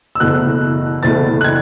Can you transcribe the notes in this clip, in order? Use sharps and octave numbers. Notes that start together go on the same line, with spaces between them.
E6
F#1 E2 B2 A3 F#6
F#1 E2 B2 A3 A6
F#6
G#6